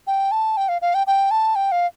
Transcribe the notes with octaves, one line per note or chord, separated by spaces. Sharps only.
G5
A5
G5
F5
F5
G5
G5
A5
G5
F5